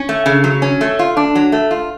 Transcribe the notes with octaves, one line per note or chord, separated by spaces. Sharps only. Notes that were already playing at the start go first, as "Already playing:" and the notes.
Already playing: C#4
A3
C#3
F#3
C#4
A3
F4
D4
F#3
A3
F4